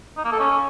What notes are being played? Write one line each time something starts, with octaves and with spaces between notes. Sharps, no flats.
D#4
A#3
A4
C#4